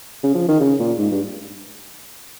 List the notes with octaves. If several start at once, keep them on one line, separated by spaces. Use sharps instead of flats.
C#3
F3
D#3
C#3
A#2
G#2
G2